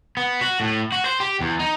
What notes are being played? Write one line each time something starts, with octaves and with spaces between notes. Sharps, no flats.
B3
F#4
A2
F#4
C5
G4
E2
D#4